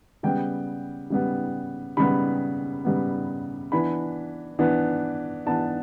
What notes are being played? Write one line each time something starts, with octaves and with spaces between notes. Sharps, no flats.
C#3 G3 B3 G5
C#3 G3 B3
C#3 G3 B3 B5
C#3 G3 B3
E3 B3 D4 B5
E3 B3 D4
E3 B3 D4 A5